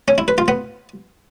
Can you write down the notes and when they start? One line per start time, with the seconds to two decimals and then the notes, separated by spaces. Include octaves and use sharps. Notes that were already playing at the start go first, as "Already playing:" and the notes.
0.08 C#4
0.18 E4
0.28 B4
0.38 F4
0.48 B3